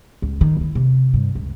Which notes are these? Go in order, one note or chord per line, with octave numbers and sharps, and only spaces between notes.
C#2
D#3
E4
C3
G2
C#2